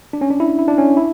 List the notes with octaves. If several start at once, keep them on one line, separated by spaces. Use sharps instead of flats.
D4
C#4
D4
E4
E4
D4
C#4
E4